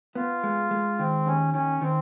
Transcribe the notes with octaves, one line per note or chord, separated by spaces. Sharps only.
B3 F4
G#3
G#3
D#3 C4
D#2 C#4
D#3 C#4
D#3 C4